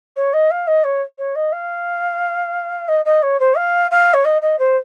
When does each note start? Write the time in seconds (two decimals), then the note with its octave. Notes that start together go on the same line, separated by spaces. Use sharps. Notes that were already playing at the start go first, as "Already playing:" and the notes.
0.16 C#5
0.33 D#5
0.51 F5
0.67 D#5
0.84 C#5
1.18 C#5
1.35 D#5
1.52 F5
2.88 D#5
3.05 D#5
3.22 C#5
3.40 C5
3.57 F5
3.91 F5
4.13 C#5
4.25 D#5
4.42 D#5
4.59 C5